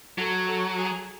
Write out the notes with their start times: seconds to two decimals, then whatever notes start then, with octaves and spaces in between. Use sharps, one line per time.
0.18 F#3 A4
0.48 A4
0.78 G#4